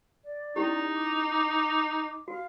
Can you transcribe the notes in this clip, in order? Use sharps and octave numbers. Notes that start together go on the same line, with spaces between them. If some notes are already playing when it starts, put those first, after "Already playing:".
D5
C#4 D#4 E4 G4
D6
F#4 F5